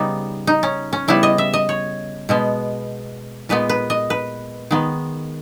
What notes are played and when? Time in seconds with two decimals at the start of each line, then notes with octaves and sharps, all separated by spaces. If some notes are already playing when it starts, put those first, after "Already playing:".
Already playing: C#3 G3 B3 D#4
0.47 D#4
0.63 C#4
0.93 C#4
1.08 C#3 G3 B3 E4
1.23 D#5
1.38 E5
1.54 D#5
1.69 C#5
2.29 B2 G#3 B3
3.49 A#2 G#3 B3 B4
3.69 B4
3.90 D#5
4.10 B4
4.71 D#3 G#3 B3